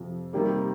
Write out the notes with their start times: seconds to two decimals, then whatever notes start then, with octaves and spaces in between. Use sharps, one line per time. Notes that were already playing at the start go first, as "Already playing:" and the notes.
Already playing: F2 C3 F3
0.33 C3 D#3 G3 A#3